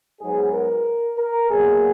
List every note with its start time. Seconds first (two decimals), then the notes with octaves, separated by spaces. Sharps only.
0.21 G#2 F#3 B3 G#4
0.53 A#4
1.18 A#4
1.50 B2 F#3 A#3 G#4